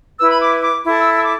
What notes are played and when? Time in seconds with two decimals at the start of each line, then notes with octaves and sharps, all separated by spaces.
0.19 E4 B4 E6
0.31 B5
0.40 D6
0.61 D6
0.83 E4 A4
0.99 E6
1.16 E6
1.25 D6